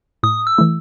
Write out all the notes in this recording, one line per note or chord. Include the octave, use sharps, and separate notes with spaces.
A2 D#6
E6
E3 A3 E4